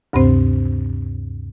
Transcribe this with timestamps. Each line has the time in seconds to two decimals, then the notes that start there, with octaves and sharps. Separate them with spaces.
0.13 D2 G2 C3 C4 C5